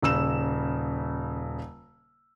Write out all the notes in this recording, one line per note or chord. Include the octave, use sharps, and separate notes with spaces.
D#1 C#3 E6 E7